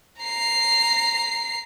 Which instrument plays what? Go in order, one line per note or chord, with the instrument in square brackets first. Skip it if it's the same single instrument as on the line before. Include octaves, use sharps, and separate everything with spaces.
[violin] A#5 C7